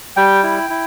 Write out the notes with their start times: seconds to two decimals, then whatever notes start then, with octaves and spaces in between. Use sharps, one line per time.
0.16 G3 G5
0.43 E4
0.70 E4